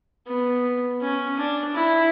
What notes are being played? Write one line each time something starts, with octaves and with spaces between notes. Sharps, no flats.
B3
C#4
D4
E4